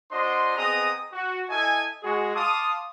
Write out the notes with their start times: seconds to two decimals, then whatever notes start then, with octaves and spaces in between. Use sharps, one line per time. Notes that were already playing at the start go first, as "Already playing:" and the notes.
0.10 D4 F#4 C5 D#5 C6
0.57 B3 C4 G#4 D#5 A#5 D#6
1.13 F#4
1.49 E4 A4 D#5 G#5
2.03 G#3 F#4 G#4
2.35 F5 A5 C6 D6 D#6